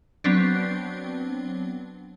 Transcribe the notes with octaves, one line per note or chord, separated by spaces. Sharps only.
F#3 B3 C4 D4